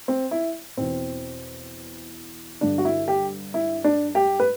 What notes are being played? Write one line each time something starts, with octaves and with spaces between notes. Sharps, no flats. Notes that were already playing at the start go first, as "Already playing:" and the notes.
C4
E4
E2 B2 C4
G2 D3 D4
F#4
E4
G4
E4
D4
G4
B4